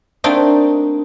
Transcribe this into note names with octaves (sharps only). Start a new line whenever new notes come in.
A3 A#3 C4 D4 D#4